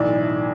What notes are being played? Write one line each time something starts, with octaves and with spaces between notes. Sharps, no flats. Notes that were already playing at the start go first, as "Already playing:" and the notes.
Already playing: B1 A2 E3 D5